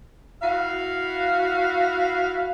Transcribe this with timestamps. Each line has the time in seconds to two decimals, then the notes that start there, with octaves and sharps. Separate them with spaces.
0.42 E4 F#4 F5